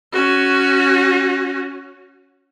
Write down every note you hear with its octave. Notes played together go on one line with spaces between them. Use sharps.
C#4 F#4